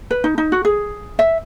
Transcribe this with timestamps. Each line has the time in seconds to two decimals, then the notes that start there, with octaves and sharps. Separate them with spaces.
0.11 B4
0.24 D#4
0.38 D#4
0.52 F#4
0.65 G#4
1.19 E5